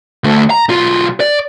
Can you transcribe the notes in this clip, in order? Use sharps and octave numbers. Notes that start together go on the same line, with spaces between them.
D3 A3
A#5
B1 F4
D5